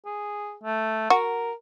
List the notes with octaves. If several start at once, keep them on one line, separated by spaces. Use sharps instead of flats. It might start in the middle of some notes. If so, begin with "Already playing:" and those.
G#4
A3
F#4 A#4